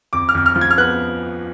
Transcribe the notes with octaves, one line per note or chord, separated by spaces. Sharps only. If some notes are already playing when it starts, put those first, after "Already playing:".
F2 D6
F6
F2
F6
F3
G#6
F6
B3 F#6